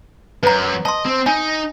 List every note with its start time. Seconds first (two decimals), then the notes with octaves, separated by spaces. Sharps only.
0.43 F#2 B4 A#5
0.85 D#5 A5 C6
1.05 C4
1.26 D#4 G#5